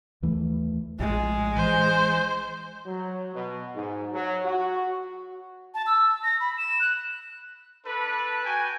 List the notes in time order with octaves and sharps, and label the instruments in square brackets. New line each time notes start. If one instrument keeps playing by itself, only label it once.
[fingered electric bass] D#2 E3 A3
[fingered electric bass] A#1 A2 [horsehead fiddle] G#3
[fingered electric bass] E3 [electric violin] C5
[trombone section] F#3
B2
G#2
F#3
F#4
[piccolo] A5
E6
A#6
B5
E7
F#6
[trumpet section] D4 A4 B4
F#4 G5 G#5